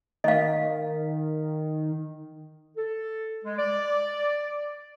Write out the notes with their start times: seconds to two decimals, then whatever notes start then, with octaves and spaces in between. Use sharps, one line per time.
0.24 D#3 D#5 F5
2.77 A4
3.44 G#3
3.57 D5